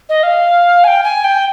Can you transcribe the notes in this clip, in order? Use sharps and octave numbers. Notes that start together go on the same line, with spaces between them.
D#5
F5
G#5
G5
G#5
G5